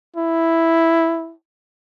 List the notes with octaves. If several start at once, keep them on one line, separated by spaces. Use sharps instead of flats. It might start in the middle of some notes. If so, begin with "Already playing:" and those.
E4